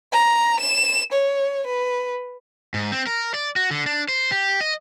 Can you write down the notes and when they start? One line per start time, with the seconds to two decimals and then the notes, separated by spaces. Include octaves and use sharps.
0.12 A#5
0.60 E7
1.12 C#5
1.66 B4
2.74 G#2
2.92 C4
3.07 A#4
3.34 D5
3.56 F#4
3.71 D3
3.86 D4
4.08 C5
4.31 G4
4.61 D#5